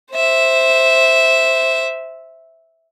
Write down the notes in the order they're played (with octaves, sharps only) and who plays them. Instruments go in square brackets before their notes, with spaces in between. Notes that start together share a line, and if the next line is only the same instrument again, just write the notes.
[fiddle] C5 E5